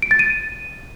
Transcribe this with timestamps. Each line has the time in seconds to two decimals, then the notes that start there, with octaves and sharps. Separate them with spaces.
0.02 D7
0.11 A6
0.19 D#7